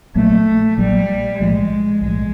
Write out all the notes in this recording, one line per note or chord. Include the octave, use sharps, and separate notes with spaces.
A#1 A#2 F#3 A3 A#3
A#1 A#2 F#3 G3 A#3
B1 A2 F3 G#3
B1 A2 F3 G#3